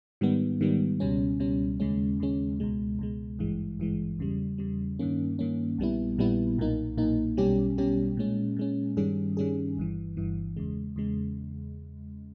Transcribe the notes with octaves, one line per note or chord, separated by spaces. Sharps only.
G#2 D#3 G3 B3
G#2 D#3 G3 B3
C#2 B2 G3 C#4
C#2 B2 G3 C#4
D#2 C#3 G#3 C#4
D#2 C#3 G#3 C#4
C#2 B2 G#3
C#2 B2 G#3
G#1 G2 E3 G#3
G#1 G2 E3 G#3
E2 C#3 G3
E2 C#3 G3
G2 D#3 A#3 C#4
G2 D#3 A#3 C#4
A#1 A#2 G3 B3 E4
A#1 A#2 G3 B3 E4
B1 A#2 A#3 D#4
B1 A#2 A#3 D#4
B1 B2 G3 C#4 G4
B1 B2 G3 C#4 G4
A#2 G#3 C#4
A#2 G#3 C#4
G2 D#3 G3 C#4 G#4
G2 D#3 G3 C#4 G#4
G1 G2 E3
G1 G2 E3
E2 C#3 G#3
E2 C#3 G#3